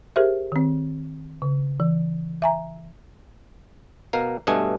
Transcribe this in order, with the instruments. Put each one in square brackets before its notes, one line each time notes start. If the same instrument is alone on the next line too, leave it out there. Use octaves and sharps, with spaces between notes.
[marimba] G4 G#4 A#4 C5 E5
D#3 C4
C#3
E3
E5 G#5 A#5
[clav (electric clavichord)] B2 A#4 F5
G2 B2 A3 D#5 G#5